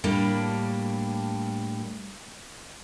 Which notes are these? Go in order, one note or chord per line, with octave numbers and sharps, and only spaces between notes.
A2 G3 A#3 D4 G4